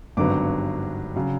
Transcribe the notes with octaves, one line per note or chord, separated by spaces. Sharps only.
G#1 G2 D3 F#3 B3 D6
C#3 F#3